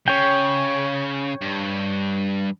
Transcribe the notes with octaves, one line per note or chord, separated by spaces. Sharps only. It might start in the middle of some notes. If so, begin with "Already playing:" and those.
C#3 C#5 G5
G2